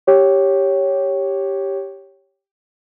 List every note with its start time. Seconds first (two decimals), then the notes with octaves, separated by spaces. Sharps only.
0.07 G4 C#5